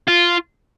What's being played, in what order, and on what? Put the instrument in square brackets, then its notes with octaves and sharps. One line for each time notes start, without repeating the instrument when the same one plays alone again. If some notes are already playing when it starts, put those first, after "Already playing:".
[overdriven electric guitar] F4